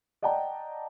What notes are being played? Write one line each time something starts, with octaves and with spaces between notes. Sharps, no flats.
D5 D#5 F#5 G5 A5 A#5